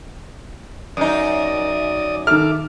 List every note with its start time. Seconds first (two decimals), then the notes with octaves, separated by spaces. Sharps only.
0.97 F#2 D#4 D5 D#6
2.27 D#3 A4 E5 D6 F6